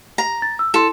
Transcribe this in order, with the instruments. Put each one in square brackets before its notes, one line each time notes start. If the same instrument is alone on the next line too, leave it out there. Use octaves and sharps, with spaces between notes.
[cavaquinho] A#5
[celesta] A6
E6
[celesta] E4 C6 [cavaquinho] A4